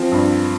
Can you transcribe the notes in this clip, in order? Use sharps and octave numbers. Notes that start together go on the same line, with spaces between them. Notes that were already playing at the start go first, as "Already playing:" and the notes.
Already playing: F3 C4
G2